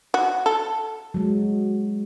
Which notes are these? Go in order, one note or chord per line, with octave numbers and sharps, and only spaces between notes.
F#4
A4
F#3 G#3